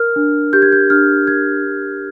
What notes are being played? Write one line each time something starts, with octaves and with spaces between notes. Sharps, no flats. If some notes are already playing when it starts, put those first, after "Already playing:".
Already playing: A#4 F6
D4
G4 G6
G#6
G6
D4 F6
A#4 G#6
D4